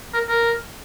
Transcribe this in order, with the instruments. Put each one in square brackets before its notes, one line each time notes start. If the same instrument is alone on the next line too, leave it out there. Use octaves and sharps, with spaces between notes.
[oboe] A#4
A#4